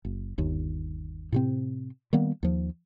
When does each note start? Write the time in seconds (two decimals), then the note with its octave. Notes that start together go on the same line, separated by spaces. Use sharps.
0.05 F#1
0.38 G1 D#2
1.32 A2 C3 C4
2.13 D#3 G3 A#3 B3
2.43 D#2 F3